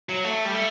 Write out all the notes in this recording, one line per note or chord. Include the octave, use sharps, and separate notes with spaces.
F#3
A3
G3
A3